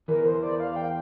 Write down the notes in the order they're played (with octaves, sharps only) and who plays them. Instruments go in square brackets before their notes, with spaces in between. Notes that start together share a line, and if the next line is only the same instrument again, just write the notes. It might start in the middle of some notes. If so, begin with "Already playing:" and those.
[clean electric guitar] E2 E3 [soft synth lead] A#4
[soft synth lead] C5
D5
F5
F5
G5